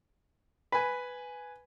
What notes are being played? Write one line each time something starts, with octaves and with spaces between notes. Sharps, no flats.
B4 G#5